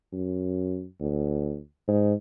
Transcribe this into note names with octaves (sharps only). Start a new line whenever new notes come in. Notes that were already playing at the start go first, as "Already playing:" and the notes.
F#2
D2
G#2